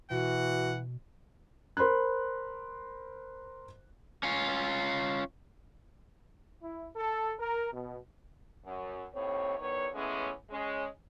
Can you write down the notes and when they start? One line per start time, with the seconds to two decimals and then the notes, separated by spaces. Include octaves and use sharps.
0.11 B2 E3 F#4 F#5
1.77 A#4 C5 B5 C6 F#6
4.23 C#4 F4
6.62 E4
6.96 A4
7.39 A#4
7.73 B2
8.65 F#2
9.14 D#2 A2 C4 C#5
9.58 E2 D#3 B3 C#5
9.95 E3 G#3 A3 B3 C#4
10.51 G#3 C#4